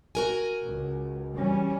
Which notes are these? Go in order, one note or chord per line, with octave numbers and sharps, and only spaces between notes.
F#4 A#4 G#5
C#2
E3 G3 C#4